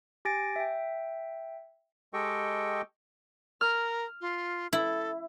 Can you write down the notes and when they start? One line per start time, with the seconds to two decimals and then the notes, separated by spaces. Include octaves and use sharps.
0.25 G4 G#5 A6 A#6 D7
0.56 E5 G5
2.13 G#3 G4 A4 D#5 G5 C#6
3.61 A#4 F6
4.21 F4
4.73 E4 A4